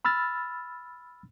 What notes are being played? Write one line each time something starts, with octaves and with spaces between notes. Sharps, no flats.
B5 E6 F6 A6